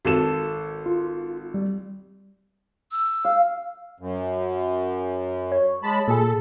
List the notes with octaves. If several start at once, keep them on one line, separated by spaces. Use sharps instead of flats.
G#1 A4 E7
F4
G3
E6
F5
F#2
C#5
G#3 A5 B5
A#2 G#4 A4